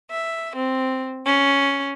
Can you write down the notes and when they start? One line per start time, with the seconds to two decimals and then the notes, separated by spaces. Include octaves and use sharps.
0.11 E5
0.56 C4
1.25 C#4